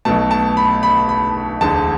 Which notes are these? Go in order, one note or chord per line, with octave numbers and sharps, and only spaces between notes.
B1 B2 A3 A5
A5
B5
B5
B5
E1 D2 D3 A5